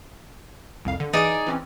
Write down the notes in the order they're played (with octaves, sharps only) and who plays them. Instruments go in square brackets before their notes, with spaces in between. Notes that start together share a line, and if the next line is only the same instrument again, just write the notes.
[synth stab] C2 F2 F5
D3
[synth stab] E3 D7 [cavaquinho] D#4 G#4 D5
[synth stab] E3 C4 C#4